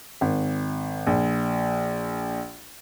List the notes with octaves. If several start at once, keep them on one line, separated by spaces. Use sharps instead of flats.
G#1
A#1